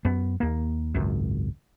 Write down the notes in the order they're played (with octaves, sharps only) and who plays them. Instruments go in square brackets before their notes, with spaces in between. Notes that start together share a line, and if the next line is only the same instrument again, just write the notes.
[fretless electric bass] F#2 B3
D#2 A#3
G#1 C#2 F#2